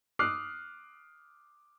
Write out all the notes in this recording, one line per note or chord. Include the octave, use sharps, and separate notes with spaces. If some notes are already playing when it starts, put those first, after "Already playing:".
D6 D#6 F6 F#6 C7